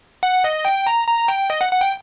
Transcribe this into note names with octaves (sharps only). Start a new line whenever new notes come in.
F#5
D#5
G5
A#5
A#5
G5
D#5
F#5
F#5
G5